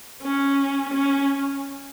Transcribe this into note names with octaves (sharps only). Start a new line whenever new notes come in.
C#4
C#4